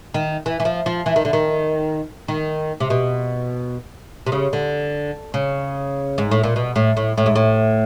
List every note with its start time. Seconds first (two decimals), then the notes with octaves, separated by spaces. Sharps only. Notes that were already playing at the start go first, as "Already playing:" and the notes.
0.14 D#3
0.46 E3
0.60 E3
0.65 F3
0.86 F3
1.06 E3
1.16 D#3
1.25 D3
1.33 D#3
2.28 D#3
2.80 C3
2.90 B2
4.26 C3
4.32 C#3
4.53 D3
5.34 C#3
6.18 G#2
6.31 A2
6.43 A#2
6.56 B2
6.76 A2
6.97 A2
7.18 A2
7.26 G#2
7.35 A2